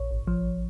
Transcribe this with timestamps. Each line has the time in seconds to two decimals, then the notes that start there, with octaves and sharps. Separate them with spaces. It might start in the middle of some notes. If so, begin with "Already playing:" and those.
Already playing: A#1 C#5
0.11 G#1
0.27 F3